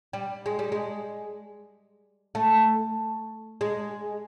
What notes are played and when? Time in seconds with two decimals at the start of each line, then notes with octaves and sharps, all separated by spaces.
0.13 G3
0.46 G#3
0.59 G3
0.72 G#3
2.35 A3
3.61 G#3